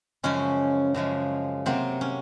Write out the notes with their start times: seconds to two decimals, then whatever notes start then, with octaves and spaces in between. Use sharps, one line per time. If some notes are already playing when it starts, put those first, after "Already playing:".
0.23 F#2 C#3 F3 G#3 C#4
0.94 F#2 C#3 F3 G#3
1.66 C3 F#3 A#3 C4
2.01 C#4